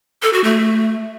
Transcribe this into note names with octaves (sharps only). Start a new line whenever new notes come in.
A4
F#4
A3